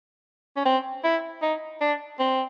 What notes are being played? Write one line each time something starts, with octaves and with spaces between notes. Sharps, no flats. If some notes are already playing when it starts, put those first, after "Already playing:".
C#4
C4
E4
D#4
D4
C4